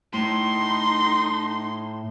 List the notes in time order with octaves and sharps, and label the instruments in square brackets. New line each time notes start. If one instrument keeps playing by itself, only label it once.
[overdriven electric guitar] A2 [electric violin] D#4 C6